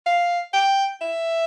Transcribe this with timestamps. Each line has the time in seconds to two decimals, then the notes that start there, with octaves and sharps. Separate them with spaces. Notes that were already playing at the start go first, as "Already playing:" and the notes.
0.06 F5
0.53 G5
1.01 E5